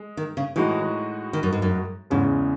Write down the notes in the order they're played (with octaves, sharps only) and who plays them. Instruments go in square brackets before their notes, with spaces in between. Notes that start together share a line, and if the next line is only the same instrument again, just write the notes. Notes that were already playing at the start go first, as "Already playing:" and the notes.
Already playing: [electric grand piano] G#3
[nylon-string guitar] D#3
C#3
[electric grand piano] A2 G#3 D#4 F#4 [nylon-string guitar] E3
[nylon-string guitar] D#3
F#2
G#2
F#2
[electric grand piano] E2 C#3 G#3 C#4 [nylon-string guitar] G#2